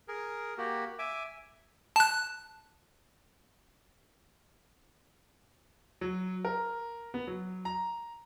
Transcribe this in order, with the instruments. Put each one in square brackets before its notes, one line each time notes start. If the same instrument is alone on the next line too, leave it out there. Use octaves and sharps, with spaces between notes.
[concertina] G#4 A#4
A#3 F#4 G4
E5 G#5 D6
[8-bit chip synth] A5 F#6
[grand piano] F#3
A#4
B3
F#3
A#5